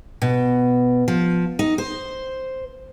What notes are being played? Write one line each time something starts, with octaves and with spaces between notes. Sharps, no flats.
B2
F3
D#4
C5